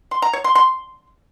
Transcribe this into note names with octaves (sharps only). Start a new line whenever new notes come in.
C6
A#5
C#5
C6
C6